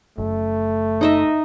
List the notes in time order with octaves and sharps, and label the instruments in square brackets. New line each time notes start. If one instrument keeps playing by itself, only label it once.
[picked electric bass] F#1 [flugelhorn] A3
[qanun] D#4 D#5 E5